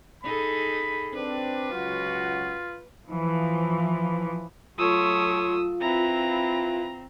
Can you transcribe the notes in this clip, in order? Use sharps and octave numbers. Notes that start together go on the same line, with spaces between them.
D#4 G#4 A4 B5
C4 D4 B4
C#2 F#3 F4 F#4
E3 F3
F#3 A3 F4 C#5 C6 D#6 E6
C4 E4 B4 A#5